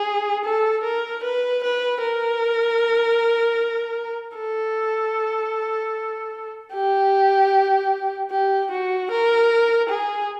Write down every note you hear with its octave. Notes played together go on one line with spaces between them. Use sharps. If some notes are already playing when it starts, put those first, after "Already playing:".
Already playing: G#4
A4
A#4
B4
B4
A#4
A4
G4
G4
F#4
A#4
G#4